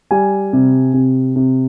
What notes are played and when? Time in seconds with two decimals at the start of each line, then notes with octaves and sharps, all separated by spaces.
0.11 G3 G#5
0.53 C3
0.94 C3
1.36 C3